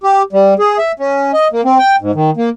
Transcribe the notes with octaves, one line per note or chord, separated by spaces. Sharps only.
G4
G3
G#4
E5
C#4
D#5
A#3
C4
G5
G#2
D#3
A#3